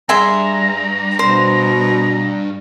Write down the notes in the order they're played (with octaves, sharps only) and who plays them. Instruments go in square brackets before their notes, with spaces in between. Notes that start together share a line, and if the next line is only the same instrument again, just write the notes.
[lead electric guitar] G2 [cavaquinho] G#4 E5 C6 [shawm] A#5
[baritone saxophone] B2 [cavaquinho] C5